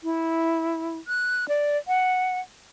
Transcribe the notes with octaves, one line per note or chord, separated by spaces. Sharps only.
E4
F#6
D5
F#5